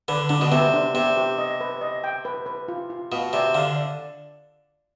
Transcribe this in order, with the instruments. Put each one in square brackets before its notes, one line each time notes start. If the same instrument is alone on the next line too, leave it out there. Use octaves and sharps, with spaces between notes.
[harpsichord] D3 [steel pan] B4
[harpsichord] D3 [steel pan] D4
[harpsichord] B2
[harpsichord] C3 [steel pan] B3
[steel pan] D4
[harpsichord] C3 [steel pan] B3
[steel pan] G4
D#5
B4
D#5
G5
B4
B4
F4
F4
[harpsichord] B2 [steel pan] F5
[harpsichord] C3 [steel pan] D5
[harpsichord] D3 [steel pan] F5
[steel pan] D5